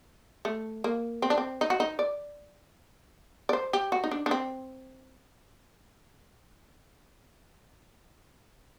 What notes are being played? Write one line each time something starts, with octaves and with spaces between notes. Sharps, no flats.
A3
A#3
C4
D4
C4
D#4
F#4
D#4
D5
D5
C5
G4
F#4
D#4
D4
D4
C4